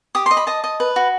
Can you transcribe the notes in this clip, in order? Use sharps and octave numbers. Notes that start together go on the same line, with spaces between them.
G4 D#6
C6
D#5
B5
D#5 A5
D#5
B4
F#4